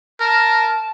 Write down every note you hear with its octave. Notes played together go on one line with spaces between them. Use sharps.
A#4 A5